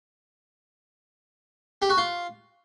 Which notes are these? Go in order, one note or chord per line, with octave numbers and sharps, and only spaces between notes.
G4
F#4
F4